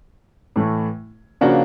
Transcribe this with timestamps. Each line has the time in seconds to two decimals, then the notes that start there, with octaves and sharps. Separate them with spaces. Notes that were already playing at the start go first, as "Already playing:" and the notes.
0.56 A2 E3 A3
1.41 C#3 F3 A#3 D4 F#4